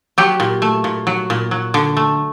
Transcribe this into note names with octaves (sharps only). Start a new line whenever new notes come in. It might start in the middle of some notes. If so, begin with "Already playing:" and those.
F#3 G4
A#2
A3
A#2
F#3
A#2
F#3
D3
A3